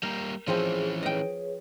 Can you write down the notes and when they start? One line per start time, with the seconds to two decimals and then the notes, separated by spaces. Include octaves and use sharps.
0.03 G3 A#3 A#4
0.48 E3 F3 C4 C#4 G#4
1.03 G#4 B4 C#5 D#5 G5